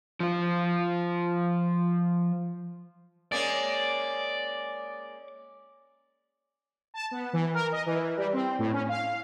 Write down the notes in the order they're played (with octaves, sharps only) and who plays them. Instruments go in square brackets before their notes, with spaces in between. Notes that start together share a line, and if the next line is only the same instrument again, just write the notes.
[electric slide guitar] F3 F4
[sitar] G#3 A#3 C#4 [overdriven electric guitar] D5
[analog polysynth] A5
B3
E3
A#4
D#5
E3
G3
C4
A2
C#4
F5